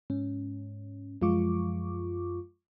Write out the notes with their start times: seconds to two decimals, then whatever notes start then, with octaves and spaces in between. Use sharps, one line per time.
0.10 G#2 C#4
1.22 F#2 F3 G#3 F4 C#6 D6